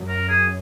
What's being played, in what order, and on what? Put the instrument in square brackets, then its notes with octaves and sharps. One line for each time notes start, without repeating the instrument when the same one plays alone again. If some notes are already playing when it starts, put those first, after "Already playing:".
Already playing: [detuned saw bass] F#2
[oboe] A#4
G#4